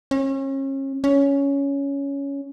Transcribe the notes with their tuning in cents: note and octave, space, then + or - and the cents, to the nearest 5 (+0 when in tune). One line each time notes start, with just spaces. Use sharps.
C#4 -35
C#4 +10